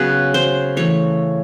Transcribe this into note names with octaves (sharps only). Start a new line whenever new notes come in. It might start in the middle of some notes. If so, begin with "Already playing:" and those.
Already playing: C#3 F#3 B3 B4
C5
E3 A3 C#5